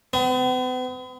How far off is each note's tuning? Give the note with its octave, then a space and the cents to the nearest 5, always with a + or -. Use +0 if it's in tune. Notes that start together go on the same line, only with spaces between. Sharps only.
B3 +45